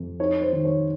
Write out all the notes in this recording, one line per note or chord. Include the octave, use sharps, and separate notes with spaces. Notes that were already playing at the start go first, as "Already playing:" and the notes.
Already playing: F2
D#4 C#5
C5
D#3
C#5